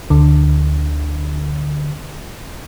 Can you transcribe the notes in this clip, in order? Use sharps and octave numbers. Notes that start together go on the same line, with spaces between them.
D2 D3